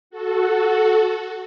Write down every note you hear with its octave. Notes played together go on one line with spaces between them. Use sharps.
F#4 A4